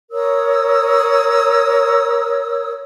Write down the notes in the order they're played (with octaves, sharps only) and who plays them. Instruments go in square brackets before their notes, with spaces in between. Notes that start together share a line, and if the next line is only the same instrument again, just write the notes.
[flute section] A#4 C#5 D#6 E6